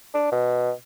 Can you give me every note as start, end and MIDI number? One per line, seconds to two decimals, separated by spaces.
0.14 0.28 62
0.32 0.71 47